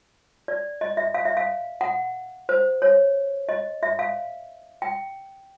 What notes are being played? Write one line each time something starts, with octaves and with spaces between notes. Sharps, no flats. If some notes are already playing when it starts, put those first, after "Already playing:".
D5
D#5
E5
F5
E5
F5
F#5
C5
C#5
D#5
E5
F5
G5